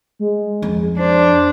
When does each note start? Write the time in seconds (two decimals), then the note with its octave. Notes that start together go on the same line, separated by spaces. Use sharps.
0.19 G#3
0.62 F2
0.99 D4 C5